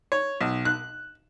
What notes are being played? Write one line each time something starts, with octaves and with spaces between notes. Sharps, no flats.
C#5
B1
F#6